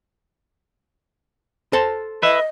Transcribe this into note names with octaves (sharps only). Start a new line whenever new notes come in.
A4 C5 A5
B4 D#5 E5